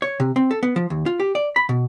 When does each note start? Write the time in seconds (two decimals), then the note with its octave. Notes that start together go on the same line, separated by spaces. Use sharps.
0.02 C#5
0.20 C3
0.36 C4
0.51 A4
0.63 B3
0.76 F3
0.90 D#2
1.06 F4
1.20 G4
1.35 D5
1.56 B5
1.69 B2